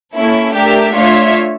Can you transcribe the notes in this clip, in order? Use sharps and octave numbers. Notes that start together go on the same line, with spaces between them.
A#3 C#4 E4 A4
A3 D4 G4 A#4 E5
A3 D4 F4 C#5 E5